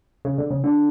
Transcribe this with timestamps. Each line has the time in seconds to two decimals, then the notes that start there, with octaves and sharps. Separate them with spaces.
0.25 C#3
0.38 D3
0.51 C#3
0.64 D3